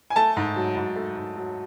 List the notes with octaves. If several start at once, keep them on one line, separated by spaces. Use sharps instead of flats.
G#5
A3 A5
G#2
F#3
G#2
A3
G#2
F#3